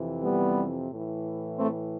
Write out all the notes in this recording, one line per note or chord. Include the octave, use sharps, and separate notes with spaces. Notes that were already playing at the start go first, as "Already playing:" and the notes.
Already playing: F2 C3 E3
G3 B3
A2 E3
A3 C4